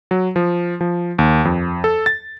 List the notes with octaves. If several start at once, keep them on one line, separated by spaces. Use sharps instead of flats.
F#3
F3
F3
D#2
F2
A4
A6